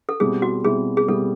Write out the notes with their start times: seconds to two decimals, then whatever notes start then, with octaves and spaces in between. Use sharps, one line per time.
0.09 A4
0.20 B2 G3 C4 E4 G#4
0.42 F#4
0.64 B2 G3 C4 E4 G#4
0.97 G#4
1.08 B2 G3 C4 E4 A4